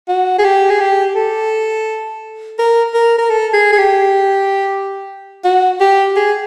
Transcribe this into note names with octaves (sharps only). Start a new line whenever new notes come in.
F#4
G#4
G4
G#4
G4
A4
A#4
A#4
A#4
A4
G#4
G#4
G4
F#4
G4
G#4